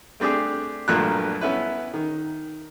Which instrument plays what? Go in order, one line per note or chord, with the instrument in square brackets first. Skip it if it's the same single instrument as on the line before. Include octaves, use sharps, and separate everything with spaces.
[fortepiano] A3 C4 D4 G4 G#4
G2 A#2 F3 F#3 A3 F#6
B3 C#4 E4 B4
D#3